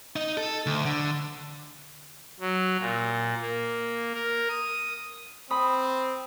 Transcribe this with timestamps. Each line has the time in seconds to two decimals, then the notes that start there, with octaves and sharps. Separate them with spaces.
0.16 D#4
0.37 A4
0.66 D2
0.85 D3
2.40 F#3
2.79 A#2
3.41 A#3
4.14 A#4
4.49 D#6
5.50 C4 B5 D#6